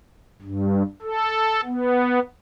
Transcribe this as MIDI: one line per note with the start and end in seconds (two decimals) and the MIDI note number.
0.42 0.83 43
1.02 1.61 69
1.65 2.19 59